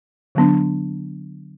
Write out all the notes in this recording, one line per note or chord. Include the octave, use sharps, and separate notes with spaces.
D3 F#3 B3 D4